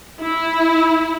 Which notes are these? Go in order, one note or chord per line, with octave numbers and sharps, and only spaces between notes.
E4